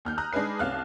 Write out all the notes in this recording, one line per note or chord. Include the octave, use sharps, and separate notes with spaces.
D#2 F6 G6
A#5 D#6 F6 F#6
G#3 D4 D#4 G#4 B4 C7
C2 C#4 F5 A5 F#6